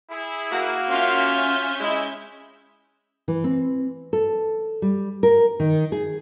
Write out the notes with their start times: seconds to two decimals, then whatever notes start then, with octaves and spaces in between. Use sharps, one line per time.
0.10 E4 G#4
0.52 A#3 F#4
0.91 C#4 F4 E5 F5 G6
1.80 G#3 E4
3.28 E3
3.44 C4
4.13 A4
4.82 G3
5.23 A#4
5.60 D#3
5.92 G#4